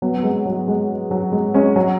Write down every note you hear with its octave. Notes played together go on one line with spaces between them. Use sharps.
F#3 B3
B3
G#3
F#3
G#3
F#3
G#3
G#3 C#4
F#3